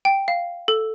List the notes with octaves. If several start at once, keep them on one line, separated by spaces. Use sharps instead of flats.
G5
F5
A4